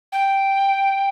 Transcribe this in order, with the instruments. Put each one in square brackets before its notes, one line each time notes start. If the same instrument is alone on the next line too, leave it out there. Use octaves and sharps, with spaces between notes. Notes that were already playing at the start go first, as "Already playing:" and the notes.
[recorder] G5